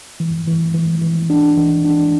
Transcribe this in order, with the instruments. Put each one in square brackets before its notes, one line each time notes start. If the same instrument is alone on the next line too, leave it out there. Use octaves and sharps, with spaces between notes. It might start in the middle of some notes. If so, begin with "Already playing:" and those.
[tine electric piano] E3
E3
E3
E3
D4
E3
D4